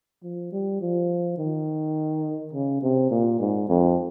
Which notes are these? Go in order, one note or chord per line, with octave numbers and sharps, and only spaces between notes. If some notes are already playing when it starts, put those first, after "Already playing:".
F3
G3
F3
D#3
C#3
C3
A#2
G#2
F2